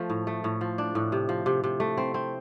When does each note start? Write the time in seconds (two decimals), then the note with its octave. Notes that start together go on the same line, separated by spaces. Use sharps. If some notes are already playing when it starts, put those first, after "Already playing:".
Already playing: F3 A3
0.10 A2
0.27 A3
0.44 A2
0.61 F3
0.78 D4
0.95 A2
1.12 C3
1.29 F3
1.46 C3
1.64 C3
1.80 A3
1.98 C4
2.14 C4